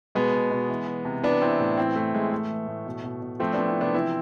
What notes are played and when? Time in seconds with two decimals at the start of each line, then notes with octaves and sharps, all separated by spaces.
0.15 B2 G#3 B3
0.33 B2
0.51 B2
0.69 E3
0.87 E3
1.05 C3
1.23 E3 B3 D4
1.41 E3 C4 E4
1.60 A2
1.78 E3 C4 E4
1.96 E3 A3
2.14 A2 G#3
2.32 E3 A3
2.50 E3
2.67 A2
2.86 B2
3.04 B2
3.22 B2
3.40 F3 A3 C4
3.53 F3 B3 D4
3.67 C4 E4
3.76 C3 B3 D4
3.95 E3 C4 E4